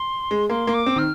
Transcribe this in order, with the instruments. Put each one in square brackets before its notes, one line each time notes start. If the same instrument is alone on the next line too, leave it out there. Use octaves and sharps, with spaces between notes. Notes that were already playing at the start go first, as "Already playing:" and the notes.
Already playing: [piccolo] C6
[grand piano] G#3
[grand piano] A#3 [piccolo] C6
[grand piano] A#3
[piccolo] D6
[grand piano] C4
[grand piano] D#3 [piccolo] F6